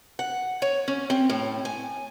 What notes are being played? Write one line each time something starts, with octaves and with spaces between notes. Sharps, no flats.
F#5
C#5
C#4
C4
A2
G#5